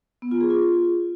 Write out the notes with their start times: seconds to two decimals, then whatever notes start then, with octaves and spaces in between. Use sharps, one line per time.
0.22 B3
0.31 F4
0.41 G#4
0.50 F4